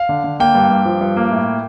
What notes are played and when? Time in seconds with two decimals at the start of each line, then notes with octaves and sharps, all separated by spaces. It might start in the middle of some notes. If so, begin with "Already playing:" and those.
Already playing: F5
0.09 D3
0.24 D3
0.40 A#3 G5
0.55 G2
0.70 G2
0.85 F3
1.01 G2
1.16 A#3
1.31 A2